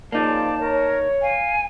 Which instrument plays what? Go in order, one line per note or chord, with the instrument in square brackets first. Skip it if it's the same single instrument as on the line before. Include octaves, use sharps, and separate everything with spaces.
[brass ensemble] C#3 F3 [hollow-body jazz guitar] A#3 D#4 [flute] D5 [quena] A5
[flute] A#4 [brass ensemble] C#5
[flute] F5 [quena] G#5